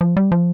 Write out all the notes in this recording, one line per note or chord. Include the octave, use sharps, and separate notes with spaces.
F3
G3
F3